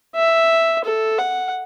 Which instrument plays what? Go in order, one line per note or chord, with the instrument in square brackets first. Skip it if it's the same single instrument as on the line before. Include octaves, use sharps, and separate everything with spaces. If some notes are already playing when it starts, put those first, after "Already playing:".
[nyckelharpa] E5
A4
F#5